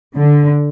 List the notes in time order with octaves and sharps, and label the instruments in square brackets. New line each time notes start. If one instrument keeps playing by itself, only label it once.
[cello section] D3